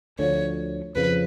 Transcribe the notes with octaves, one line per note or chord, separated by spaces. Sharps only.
D2 D3 F3 C#5
F2 C#3 F3 B4